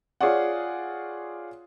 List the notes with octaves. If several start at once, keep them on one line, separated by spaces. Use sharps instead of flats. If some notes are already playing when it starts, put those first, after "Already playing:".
F4 G#4 C#5 D5 F#5